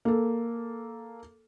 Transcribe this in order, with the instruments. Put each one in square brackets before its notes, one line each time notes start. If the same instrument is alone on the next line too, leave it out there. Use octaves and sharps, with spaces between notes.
[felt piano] A#3 A4